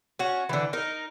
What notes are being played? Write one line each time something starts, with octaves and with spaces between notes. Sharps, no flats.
C#4 F#4
D3 E3
D#4 A#4